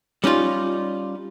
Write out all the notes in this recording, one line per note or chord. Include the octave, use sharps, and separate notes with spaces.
G3 C#4 D#4 F4